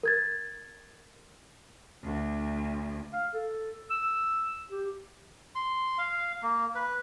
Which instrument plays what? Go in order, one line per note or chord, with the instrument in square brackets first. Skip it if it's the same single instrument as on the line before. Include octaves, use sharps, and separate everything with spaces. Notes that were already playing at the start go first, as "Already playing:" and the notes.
[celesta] A#4 G#6 A6
[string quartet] D2
[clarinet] F5
A4
E6
G4
[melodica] C6
F5
A#3
B4